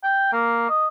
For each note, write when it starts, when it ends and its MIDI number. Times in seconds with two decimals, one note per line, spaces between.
0.03 0.32 79
0.33 0.65 58
0.69 0.87 75